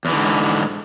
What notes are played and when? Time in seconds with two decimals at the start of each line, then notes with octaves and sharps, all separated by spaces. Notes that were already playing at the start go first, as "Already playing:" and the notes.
0.05 E2
0.08 E3
0.12 D3
0.16 G#2